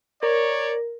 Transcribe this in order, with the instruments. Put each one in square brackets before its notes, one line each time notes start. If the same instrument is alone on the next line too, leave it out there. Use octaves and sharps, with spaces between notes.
[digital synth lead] A#4 [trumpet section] C#5 D5